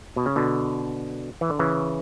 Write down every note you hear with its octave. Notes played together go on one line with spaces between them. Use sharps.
B2
C#3
B2 D3
E3
D3
C#3 E3